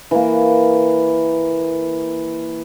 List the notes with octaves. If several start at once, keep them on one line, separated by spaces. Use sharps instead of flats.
E3 A#3